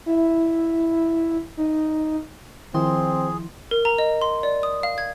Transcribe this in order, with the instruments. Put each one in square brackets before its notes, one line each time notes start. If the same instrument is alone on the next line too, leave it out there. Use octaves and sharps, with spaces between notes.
[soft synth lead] E4
D#4
[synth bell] D#3 C6 [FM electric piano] F3 E4 [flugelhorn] C4 [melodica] G#4
[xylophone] A#4
A#5
D#5
C6
D5
D#6
F5
G#6